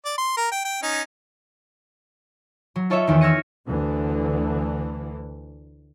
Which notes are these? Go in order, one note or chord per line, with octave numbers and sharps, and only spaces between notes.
D5
C6
A#4
G5
G5
C#4 D#4
F#3
F4 A4 C#5 D#5 E5
E2 D#3
E6 F6 G#6 A#6 C#7 D#7
D2 D3 E3